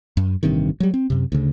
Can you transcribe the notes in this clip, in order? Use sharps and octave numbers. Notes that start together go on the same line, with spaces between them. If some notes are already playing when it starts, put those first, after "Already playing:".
F#2
A1 G2 C3 D#3
F#3 G3
C4
F#2 C3
D2 C#3